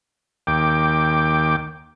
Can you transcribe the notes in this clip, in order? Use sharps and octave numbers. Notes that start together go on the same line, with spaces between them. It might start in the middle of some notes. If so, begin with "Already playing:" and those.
D#2 G5 D6